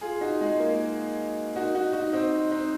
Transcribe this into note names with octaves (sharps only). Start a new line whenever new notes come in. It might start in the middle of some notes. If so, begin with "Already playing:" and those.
F4 G#4
D#4 F#4
G#3
A#3
D#4 F#4
D#4 F#4
D#4 F#4
C4 D#4
C4 D#4